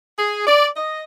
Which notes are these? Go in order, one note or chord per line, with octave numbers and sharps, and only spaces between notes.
G#4
D5
D#5